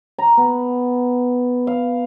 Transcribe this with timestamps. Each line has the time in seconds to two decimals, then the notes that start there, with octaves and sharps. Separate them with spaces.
0.18 A#5
0.37 B3
1.67 F5